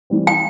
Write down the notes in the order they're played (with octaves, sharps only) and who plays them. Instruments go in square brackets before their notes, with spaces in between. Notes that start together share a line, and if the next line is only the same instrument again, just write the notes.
[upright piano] E3 G3 C4
[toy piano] G5